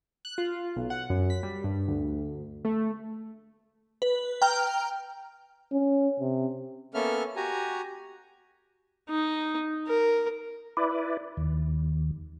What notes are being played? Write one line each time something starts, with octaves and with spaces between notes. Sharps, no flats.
F#6
F4
B1
F#5
F#2
B6
G3
G2
D2
A3
B4
G5 A#5 F6
C#4
C3
A#3 B3 C#4 A4 E5 F6
F#4 G4 G#5 A#5
D#4
A#4
E4 B4 D5
D#2